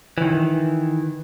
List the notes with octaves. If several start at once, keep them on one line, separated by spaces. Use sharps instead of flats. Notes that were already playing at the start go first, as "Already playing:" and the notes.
D#3 E3